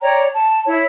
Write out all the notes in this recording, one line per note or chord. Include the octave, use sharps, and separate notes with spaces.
C#5 D5 G5 A#5
A5
E4 C#5